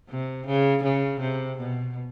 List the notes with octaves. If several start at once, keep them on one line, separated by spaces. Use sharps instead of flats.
C3
C#3
C#3
C3
B2